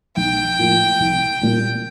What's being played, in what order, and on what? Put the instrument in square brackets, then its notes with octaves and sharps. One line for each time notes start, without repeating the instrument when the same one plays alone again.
[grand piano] B1 [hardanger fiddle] G5
[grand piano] A2 F3 A#3
C2
A#2 G3